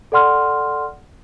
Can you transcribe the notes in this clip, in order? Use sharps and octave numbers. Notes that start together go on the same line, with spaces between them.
A4 D5 F#5 C6 F6